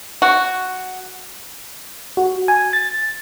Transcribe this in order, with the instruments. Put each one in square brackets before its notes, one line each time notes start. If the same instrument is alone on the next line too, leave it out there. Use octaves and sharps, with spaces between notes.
[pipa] F#4
[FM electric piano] F#4
G#5
A6